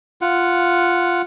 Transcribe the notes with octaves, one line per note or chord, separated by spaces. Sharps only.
F4 F#5